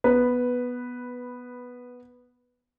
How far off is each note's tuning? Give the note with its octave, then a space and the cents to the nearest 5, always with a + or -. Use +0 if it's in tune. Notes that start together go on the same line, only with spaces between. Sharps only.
B3 -5 B4 +0